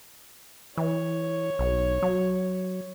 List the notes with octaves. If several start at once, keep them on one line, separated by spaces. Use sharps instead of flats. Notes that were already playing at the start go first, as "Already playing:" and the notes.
E3 C#5
B1
F#3